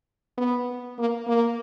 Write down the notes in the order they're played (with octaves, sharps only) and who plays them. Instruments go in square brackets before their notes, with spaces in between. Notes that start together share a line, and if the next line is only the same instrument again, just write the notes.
[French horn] B3
A#3
A#3